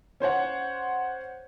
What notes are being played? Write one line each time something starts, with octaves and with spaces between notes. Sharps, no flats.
C#4 C5 C#5 F#5